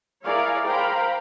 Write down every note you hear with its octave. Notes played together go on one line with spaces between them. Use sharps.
E4 G#4 A#4 C#5 D5 F5
A#4 C5 F5 G5 A#5 B5